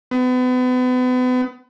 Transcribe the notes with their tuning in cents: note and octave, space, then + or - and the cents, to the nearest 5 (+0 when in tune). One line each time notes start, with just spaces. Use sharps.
B3 +35